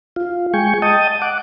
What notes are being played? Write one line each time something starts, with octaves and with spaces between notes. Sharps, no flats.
F4
G#3 G5 G#5 C#6
D#5 G5 A5 D#6
F#5 D6